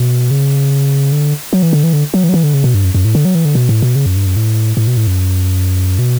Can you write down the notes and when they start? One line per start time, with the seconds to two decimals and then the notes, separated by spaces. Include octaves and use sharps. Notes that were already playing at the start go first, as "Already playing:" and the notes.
Already playing: B2
0.31 C#3
1.12 D3
1.53 F#3
1.63 E3
1.73 D3
1.84 E3
1.93 D3
2.14 F#3
2.24 E3
2.29 F#3
2.34 E3
2.43 D3
2.54 C#3
2.64 B2
2.74 G2
2.84 F#2
2.95 F#2
3.05 A2
3.15 D3
3.25 F#3
3.35 E3
3.45 D3
3.55 B2
3.69 A2
3.82 B2
3.96 C#3
4.06 F#2
4.16 G2
4.26 F#2
4.36 A2
4.77 A2
4.87 B2
4.97 A2
5.07 F#2
5.99 B2